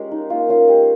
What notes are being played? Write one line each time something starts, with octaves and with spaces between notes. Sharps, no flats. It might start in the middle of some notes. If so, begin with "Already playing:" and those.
Already playing: G#3 C#4 F4 G4 A#4
D#4
A#3 F4
C#4 F4
G#3 G4